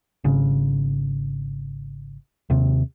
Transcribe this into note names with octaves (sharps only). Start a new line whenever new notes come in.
G#1 C#3
D#2 C3